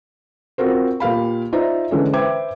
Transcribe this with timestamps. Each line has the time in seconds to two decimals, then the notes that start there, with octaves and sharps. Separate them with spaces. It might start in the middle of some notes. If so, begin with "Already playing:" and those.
0.58 C4 F4 F#4 A#4 C5
1.00 A#2 G4 F5 B5
1.53 D#4 F4 C5 D5 E5 A#5
1.91 D3 E3 G#3 C#4
2.13 B4 C5 E5 G5 D6 G#6